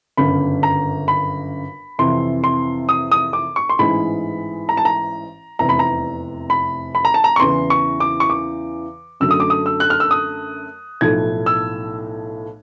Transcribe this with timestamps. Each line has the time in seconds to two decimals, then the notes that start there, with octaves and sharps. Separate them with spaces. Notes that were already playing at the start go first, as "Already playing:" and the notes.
0.17 G1 F#2 C#3 B5
0.63 A#5
1.08 B5
1.99 F2 C3 E3 C6
2.44 C6
2.89 D#6
3.12 D#6
3.33 D6
3.56 C#6
3.69 C6
3.79 A1 G#2 E3 G#3 B5
4.69 A#5
4.77 A5
4.85 A#5
5.59 F1 E2 C3 A#5
5.69 B5
5.79 A#5
6.50 B5
6.95 B5
7.05 A#5
7.14 A5
7.24 A#5
7.36 C#6
7.40 E2 C#3 E3 C6
7.70 C#6
8.00 D6
8.20 C#6
8.30 D6
9.20 F#2 D3 F#3 A3 E6
9.31 D#6
9.40 D6
9.50 D#6
9.66 E6
9.80 F#6
9.90 F6
10.00 E6
10.11 D#6
11.01 B1 A2 F3 A3 G#6
11.46 E6